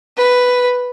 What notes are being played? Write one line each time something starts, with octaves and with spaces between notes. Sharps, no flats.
B4